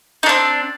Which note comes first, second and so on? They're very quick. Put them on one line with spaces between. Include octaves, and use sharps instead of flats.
D#4 D4 C4